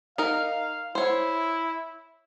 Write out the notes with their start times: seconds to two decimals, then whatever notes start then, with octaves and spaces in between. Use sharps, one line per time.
0.18 D#4 A#4 F5
0.95 E4 C5 C#5